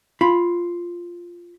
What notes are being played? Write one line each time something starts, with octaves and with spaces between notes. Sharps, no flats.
F4 B5